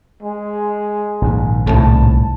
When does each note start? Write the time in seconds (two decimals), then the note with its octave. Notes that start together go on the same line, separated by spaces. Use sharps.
0.23 G#3
1.22 A#1 G#2 D#3
1.67 C2 A2 A5